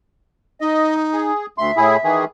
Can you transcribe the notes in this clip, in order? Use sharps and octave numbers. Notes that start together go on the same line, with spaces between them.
D#4 D#5
G#4
D2 E5 C6
A2 E4 G#4
D#3 E3 G#4